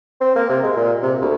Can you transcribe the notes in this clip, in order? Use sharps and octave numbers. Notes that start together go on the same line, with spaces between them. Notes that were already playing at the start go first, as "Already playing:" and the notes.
C4
A#3
C3
G#3
A#2
C3
D2